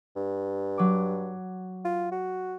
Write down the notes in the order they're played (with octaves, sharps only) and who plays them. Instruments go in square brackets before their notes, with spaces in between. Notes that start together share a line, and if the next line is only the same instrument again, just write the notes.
[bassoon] G2
[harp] F#3 D6
[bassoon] F4
F#4